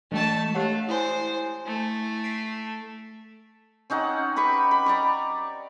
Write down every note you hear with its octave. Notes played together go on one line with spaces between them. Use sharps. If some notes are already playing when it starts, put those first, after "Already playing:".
E3 G#3 A3 A5
A3 G4 C#5 F#5
E4 C5 G#5
A3
B6 C7 D7
C4 C#4 D#4 F#5
G4 B4 B5 C#6
B5
D5 A#5 C#6